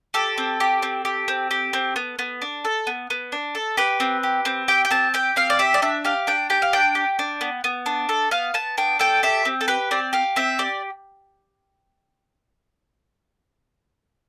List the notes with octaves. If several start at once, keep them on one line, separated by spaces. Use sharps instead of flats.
G4 A4
C4
G4
C4
G4
C4
G4
C4
B3
B3
D4
A4
B3
B3
D4
A4
G4 B4
C4
G4
C4
G4 G5
G5
C4 A5
G4 G5
C4 F5
D5
G4 E5
D5
D4 E5
G4 F5
D4 G5
G4 G5
F5
D4 G5
G4
D4
B3
B3
D4
A4
B3 F5
B3 A5
D4 G5
A4 G5
G4 E5
C4
A4
G4 B4
C4 D5
G4 F5
C4 E5
G4 D5